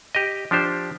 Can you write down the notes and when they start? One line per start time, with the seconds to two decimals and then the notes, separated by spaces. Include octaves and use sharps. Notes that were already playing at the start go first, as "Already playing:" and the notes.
0.15 G4 D#5
0.51 F3 D4 G4 C5